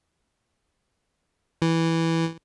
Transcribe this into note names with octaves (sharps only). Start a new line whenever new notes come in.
E3